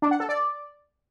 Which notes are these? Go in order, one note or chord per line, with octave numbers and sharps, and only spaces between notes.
D4
F#5
A4
D5